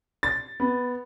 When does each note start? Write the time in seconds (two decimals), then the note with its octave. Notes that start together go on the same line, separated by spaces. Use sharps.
0.23 A6
0.60 B3